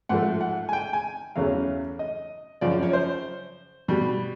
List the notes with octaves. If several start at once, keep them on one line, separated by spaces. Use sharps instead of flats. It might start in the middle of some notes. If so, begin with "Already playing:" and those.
G#2 F3 A3 F#5
F#5
G#5
G5
G#5
E2 C#3 F#3 A3 F5
D#5
F#2 C#3 F3 D5
C#5
C5
B2 G3